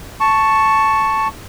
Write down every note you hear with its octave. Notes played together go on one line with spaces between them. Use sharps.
A5 C#6